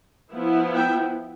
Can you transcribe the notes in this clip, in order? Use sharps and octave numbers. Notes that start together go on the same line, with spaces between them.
F3 B3 E4
E5 G5